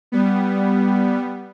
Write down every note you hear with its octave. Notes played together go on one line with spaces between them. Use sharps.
G3 B3